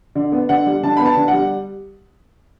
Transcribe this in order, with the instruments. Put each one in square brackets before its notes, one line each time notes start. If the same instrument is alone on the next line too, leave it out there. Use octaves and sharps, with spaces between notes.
[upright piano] D3
B3
D3 F#5
G3
D3 A5
B3 B5
A5
D3
F#5
G3